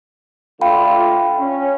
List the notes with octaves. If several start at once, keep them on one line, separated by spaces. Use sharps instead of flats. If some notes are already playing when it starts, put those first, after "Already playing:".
D3 A3 F4 F5 G5 B5
C#4